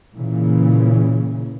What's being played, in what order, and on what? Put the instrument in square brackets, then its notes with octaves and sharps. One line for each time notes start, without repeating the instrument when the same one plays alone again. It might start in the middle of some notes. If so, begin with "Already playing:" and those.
[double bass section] A#2 C#3 E3